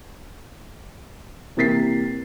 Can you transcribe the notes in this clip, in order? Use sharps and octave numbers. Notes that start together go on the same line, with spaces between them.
C3 E3 A#3 A6 B6 C7